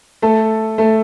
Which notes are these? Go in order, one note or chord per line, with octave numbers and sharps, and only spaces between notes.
A3 A4
A3 A4